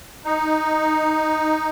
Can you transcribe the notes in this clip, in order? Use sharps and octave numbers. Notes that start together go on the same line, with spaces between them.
D#4